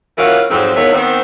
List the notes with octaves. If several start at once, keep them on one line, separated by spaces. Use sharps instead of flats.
E3 C#4 F4 F#4 A#4
F2 G#2 F#3 C4
E2 D#3 F4 C#5 E5
D#3 B3 C4